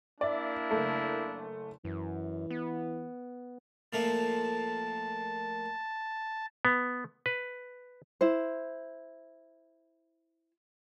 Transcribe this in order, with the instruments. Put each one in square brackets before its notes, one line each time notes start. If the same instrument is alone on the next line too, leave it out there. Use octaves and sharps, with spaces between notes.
[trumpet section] A#3 D4 E4 [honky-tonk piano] D5 E5
[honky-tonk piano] F#1 A3
[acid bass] F#2 [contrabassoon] E3
[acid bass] B3
[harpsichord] A#2 F3 A3 [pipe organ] A5
[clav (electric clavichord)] B3
B4
[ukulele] E4 C5